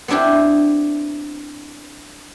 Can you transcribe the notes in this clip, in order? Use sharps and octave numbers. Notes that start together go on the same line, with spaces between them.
B3 C4 D4 E4 G4